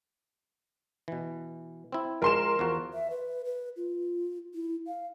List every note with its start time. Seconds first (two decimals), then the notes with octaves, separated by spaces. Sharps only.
1.08 B2 E3
1.92 C4 E4
2.22 F3 G#3 A#4 C6 E7
2.59 E2 F3 F#4
2.93 E5
3.10 B4
3.45 B4
3.76 F4
4.54 E4
4.87 F5